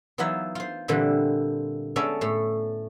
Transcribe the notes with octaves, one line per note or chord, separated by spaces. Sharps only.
E3 F#3 B3 D#4 F4 E5
F4 C5
A#2 D3 E3 G3 C4
G#3 B3 C#4 A4 D5 E5
A2 A3